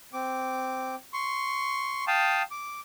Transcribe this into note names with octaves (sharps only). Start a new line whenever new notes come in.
C4 D6
C6 C#6
F5 G5 A5 D#6
D6